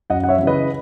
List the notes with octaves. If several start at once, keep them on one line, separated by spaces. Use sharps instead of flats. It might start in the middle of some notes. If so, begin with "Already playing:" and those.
F#2 D#5 F#5
F#5
C#5 E5
E3
C#3 B4 D#5